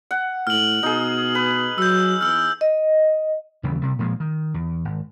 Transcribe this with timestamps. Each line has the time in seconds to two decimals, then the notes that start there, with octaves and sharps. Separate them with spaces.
0.11 F#5
0.47 A2 F6 F#7
0.83 B2 D#4 G#4
1.35 B4
1.78 F#3 E6 G6
2.21 E2 E6 F6
2.61 D#5
3.63 D#2 C#3 E3 G3
3.82 C3 G3
3.99 A#2 F3 F#3 G#3
4.20 D#3
4.54 E2
4.85 G#1